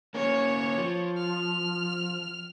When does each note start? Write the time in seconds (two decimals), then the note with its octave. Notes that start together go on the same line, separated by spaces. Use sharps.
0.14 A#3 C#4 C#5
0.78 F3
1.17 F6